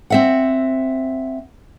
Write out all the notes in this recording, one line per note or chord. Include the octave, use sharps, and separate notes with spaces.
C4 E5 F#5